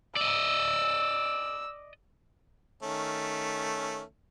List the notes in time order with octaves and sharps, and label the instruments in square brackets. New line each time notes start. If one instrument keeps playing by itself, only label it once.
[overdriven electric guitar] D5 D#5 [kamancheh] E6
[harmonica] D#3 A3 C#4